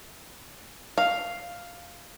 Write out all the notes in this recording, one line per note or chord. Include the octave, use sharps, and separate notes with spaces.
F5